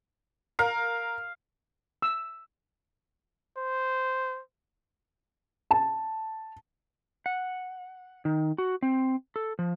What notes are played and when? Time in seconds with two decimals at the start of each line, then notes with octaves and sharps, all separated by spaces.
0.59 A#4 F5
2.02 E6
3.57 C5
5.71 A5
7.26 F#5
8.25 D#3
8.58 F#4
8.82 C4
9.36 A4
9.59 F3